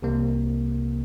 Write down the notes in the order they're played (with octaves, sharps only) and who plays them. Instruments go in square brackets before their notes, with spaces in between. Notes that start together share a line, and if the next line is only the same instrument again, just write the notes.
[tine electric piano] C2 C3 A#3